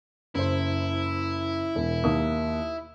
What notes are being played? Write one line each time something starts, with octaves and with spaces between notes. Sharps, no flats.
F#1 E4 C5
E1
D#2 A#3 D#6